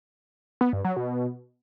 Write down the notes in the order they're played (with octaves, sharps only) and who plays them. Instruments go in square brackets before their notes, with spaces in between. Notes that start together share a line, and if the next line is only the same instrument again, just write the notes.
[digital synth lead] B3
G2
F#3
B2